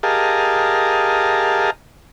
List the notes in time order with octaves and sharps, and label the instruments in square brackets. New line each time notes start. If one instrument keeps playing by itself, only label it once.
[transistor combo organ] G4 G#4 A#4 D#5 F5 A5